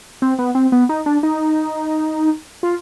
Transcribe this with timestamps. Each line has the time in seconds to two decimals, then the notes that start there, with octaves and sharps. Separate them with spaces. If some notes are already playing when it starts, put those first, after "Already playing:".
0.22 C4
0.39 B3
0.55 C4
0.72 B3
0.89 D#4
1.06 D4
1.23 D#4
2.63 F4